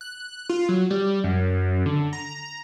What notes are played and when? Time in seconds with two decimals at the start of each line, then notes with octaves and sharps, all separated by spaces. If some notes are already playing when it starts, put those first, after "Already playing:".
0.01 F#6
0.49 F4
0.69 F#3
0.90 G3
1.24 F#2
1.86 D3
2.13 A#5